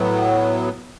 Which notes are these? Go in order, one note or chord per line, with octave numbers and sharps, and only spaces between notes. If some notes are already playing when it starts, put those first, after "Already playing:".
Already playing: A2 F#3 B3